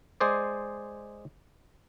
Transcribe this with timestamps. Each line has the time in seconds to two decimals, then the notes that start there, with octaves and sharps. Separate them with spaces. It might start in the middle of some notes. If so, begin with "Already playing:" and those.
0.20 G#3 G#4 C5 D5